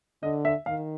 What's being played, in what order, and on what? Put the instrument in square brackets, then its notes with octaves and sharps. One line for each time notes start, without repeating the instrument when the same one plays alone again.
[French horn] D3 [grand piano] D#5
[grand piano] E5
[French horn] D#3 [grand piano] F5